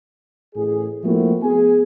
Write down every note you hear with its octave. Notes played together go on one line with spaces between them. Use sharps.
A1 G#4
F3 A3 A#3 C4 E4 F#4
B3 G#4 G#5